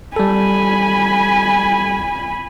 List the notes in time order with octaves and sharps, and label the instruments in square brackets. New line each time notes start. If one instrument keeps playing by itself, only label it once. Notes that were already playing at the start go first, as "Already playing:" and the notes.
[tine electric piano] G3 A4 [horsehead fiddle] G#5 B5